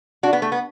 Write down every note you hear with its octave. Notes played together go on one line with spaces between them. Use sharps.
D4 F#4
B3
A3
B3